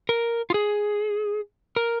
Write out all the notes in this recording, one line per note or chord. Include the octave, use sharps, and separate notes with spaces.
A#4
F4
G#4
A#4